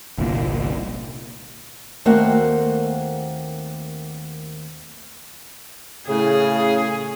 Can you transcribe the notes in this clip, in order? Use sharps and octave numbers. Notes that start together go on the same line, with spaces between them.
G1 C2 A#2
D#2 A3 A#3 C4 F#4 F#5
A2 C#3 G#4